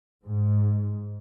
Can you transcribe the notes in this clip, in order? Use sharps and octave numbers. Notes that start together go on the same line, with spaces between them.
G#2